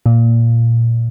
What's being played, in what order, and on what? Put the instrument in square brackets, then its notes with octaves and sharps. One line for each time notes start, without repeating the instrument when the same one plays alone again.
[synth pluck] A#2